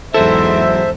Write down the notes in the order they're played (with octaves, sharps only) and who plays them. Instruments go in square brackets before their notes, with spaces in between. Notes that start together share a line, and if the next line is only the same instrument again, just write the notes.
[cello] E2 G#2 [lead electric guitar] F#3 E4 [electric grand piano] A4 [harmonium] C5 E5